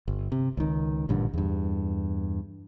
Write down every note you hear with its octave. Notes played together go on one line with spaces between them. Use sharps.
G1
C3
C#2 D#3
A1 G2 A#2 D3
E2 G2